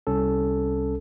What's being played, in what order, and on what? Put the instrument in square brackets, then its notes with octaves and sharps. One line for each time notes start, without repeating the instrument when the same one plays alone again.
[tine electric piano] C2 C#4 A4